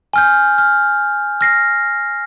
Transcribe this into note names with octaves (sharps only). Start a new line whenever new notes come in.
G#5 F6 G6
F6
F6 A#6 C7